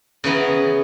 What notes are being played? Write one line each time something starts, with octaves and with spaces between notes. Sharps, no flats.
C#3 E3 B3 A#5